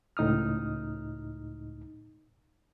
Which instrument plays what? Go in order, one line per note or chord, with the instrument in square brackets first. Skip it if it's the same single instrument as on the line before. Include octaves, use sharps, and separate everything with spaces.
[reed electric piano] C#2 A2 D#4 D#6 F6